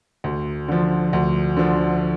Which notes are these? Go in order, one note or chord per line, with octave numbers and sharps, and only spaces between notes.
D2
D3 F3
D2
D3 F3